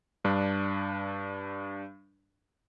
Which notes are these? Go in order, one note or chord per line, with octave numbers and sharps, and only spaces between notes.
G2 D4